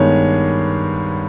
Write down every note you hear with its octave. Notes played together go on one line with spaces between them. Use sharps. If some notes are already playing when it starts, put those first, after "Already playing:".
Already playing: G2 D#3 G#3 B3 C#5